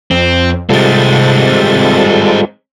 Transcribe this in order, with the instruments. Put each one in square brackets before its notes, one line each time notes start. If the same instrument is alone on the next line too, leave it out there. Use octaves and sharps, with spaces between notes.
[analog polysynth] F2 [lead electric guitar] C4
[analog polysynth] C3 A6 [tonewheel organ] G3 F4 A4 [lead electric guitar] G#3 C4